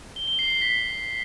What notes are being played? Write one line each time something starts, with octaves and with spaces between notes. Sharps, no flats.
G7
G7
C7
G7
B6